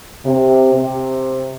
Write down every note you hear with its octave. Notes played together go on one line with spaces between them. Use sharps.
C3
C3